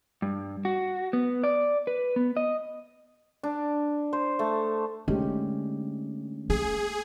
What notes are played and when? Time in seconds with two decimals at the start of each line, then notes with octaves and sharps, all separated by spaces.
0.22 G2
0.65 F#4
1.13 B3
1.44 D5
1.87 B4
2.16 B3
2.37 D#5
3.43 D4
4.13 C5
4.39 A3
5.08 D3 G#3 A3 C#4 D#4 G4
6.50 A#3 G#4